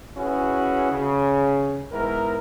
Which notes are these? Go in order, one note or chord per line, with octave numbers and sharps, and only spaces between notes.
C#4 E4 F#4 G#4 B4
C#3
G#2 B3 E4 A#4